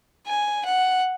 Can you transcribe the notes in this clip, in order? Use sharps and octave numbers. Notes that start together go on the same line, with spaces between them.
G#5
F#5